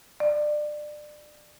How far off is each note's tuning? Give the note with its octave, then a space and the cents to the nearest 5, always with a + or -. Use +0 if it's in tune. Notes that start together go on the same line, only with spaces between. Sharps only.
D5 +25